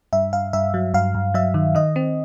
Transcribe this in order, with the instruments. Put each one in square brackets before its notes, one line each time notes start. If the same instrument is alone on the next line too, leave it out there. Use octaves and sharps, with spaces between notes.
[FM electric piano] G2 E5
G2 F5
G2 E5
F#3
G2 F5
G2
F#3 E5
D#3
D#3 D#5
C4